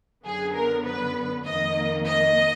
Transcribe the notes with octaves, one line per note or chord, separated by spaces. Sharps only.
F#2 D3 F#3 B3 G#4
A#4
B4
F2 D#3 A#3 D#5
D#5